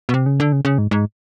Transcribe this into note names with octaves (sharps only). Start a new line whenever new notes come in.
B2
C3
C#3
D3
C#3
C#3
G#2
G#2